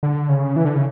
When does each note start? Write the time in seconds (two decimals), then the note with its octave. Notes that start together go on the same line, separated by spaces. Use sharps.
0.03 D3
0.29 C#3
0.56 E3
0.65 D3
0.75 C#3